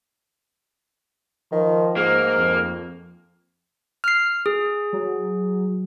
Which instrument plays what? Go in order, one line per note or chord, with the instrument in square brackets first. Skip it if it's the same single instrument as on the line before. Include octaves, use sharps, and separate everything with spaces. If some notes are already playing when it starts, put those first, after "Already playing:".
[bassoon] D#3 [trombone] F3
[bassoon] G#2 [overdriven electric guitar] A#3
[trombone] F2
[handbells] F6 C7
G#4
[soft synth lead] F#3